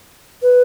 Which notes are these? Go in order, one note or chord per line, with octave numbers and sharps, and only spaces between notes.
B4